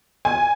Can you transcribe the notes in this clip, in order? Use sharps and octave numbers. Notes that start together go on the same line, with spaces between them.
G#5